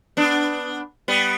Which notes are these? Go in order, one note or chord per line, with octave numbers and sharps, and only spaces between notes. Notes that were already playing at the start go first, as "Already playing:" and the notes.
B3 D4
G3 B3